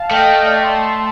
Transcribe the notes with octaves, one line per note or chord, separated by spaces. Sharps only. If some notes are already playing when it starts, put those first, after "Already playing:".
Already playing: F5 A5
A3 D#5 G5
D#5
D5 F5
A5 C6